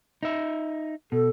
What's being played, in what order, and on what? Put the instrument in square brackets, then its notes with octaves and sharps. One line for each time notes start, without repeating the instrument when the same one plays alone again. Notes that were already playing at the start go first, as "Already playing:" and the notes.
[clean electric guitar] D#4 E5
[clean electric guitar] B2 [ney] A4